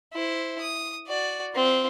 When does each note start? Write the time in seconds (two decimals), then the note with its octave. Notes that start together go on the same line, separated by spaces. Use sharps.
0.13 E4 C5
0.60 D#6
1.07 F#4 D5
1.54 C4 F4